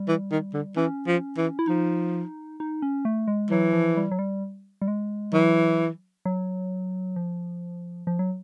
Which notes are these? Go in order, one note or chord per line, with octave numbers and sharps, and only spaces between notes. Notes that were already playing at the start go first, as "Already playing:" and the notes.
Already playing: G3
E3
D#3
D3
E3 C#4
F3
E3
E4
F3 D#4
D#4
C#4
A3
G#3
E3 F#3
F3
G3
F#3
G3
G3
G#3
E3 F#3
F#3
F3
F3
F#3